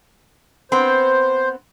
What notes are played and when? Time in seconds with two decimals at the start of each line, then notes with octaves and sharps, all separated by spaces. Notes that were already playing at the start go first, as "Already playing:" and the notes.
0.72 B3 C4 C5